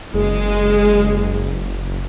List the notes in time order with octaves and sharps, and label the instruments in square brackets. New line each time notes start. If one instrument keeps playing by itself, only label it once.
[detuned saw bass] F#1 [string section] G#3